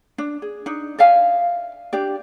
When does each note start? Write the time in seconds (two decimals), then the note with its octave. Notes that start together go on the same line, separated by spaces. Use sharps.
0.18 D4
0.42 G#4
0.66 D4 D#4
0.98 D5 E5 F5 G#5
1.93 D4 G4 D5